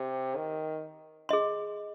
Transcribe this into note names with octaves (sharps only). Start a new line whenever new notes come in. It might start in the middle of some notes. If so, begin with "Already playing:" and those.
Already playing: C3
D#3
G#4 D#5 C6